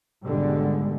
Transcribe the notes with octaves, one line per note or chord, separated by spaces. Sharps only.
G#1 C#2 B2 D3 G3 G#3